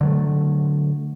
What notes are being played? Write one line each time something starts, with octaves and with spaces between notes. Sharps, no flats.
D3 F#3 A3